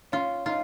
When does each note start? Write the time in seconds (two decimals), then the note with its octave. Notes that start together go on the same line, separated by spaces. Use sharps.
0.12 C#4 F4
0.46 D#4 F4